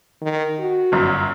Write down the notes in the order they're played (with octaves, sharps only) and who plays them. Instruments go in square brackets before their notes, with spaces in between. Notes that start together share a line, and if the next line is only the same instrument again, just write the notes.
[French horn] D#3
F#4
[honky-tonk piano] G1 F#2